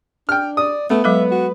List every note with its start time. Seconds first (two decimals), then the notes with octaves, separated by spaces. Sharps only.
0.29 D4 G5 F6
0.57 D5 D#6
0.90 A3 B3
1.04 F#3 G#3 A4 B4 E5
1.31 F#4